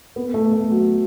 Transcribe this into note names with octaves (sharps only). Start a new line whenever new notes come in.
B3
A3
A3
F#3